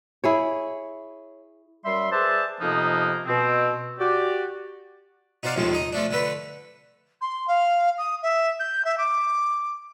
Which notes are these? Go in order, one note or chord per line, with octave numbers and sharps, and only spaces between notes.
E4 G#4 C#5
F#2 G3 E5 C6
G#4 B4 C5 D5 E5 A5
F2 C3 F3 A#3 B3 D#4
B2 C4
F#4 G4 D5
D#4 F#4 C5 D5 F5
A#1 D#2 A2 F3 G#3
D#4 D#5
F3 A3 D4
D3 A3 B4 B5
C6
F5
D#6
E5
G6
E5
D6